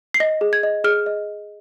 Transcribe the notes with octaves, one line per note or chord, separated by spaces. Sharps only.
C7
D#5 A#6
G#4
G#6
D#5
G#4 F6
D#5